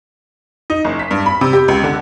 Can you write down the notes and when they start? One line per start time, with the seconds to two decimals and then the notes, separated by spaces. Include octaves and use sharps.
0.70 D#4
0.84 F#1
0.99 B6
1.11 G2
1.26 B5
1.41 C3
1.53 G4
1.68 C#2
1.84 D3